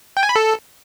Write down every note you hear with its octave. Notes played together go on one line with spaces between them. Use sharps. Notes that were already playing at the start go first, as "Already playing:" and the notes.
G5
G#5
B5
A4